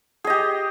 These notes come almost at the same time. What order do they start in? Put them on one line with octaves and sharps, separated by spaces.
G#4 D#5 G4